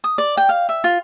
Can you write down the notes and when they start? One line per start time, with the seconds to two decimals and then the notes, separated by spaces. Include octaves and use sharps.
0.04 D#6
0.18 D5
0.37 G5
0.49 F5
0.69 E5
0.84 F4